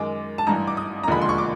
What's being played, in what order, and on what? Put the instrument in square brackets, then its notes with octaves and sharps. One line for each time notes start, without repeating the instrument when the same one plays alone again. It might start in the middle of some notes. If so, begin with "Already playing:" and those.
Already playing: [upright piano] F#2 D#3 G#3 D6
A5
A1 G2 E3 A#5
D6
D#6
A#5
E1 D#2 D3 F3 G#3 B5
C6
C#6
D6